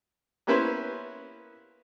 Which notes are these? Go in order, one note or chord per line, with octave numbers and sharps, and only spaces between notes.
A#3 B3 C#4 E4 B4 C5